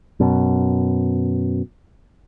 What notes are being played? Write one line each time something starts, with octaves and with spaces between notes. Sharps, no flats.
F#2 B2